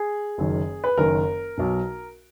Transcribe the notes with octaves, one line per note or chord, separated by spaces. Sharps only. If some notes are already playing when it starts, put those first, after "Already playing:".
Already playing: G#4
F#1 F#2 D#3
B4
F#1 F#2 D#3 A#4
B1 B2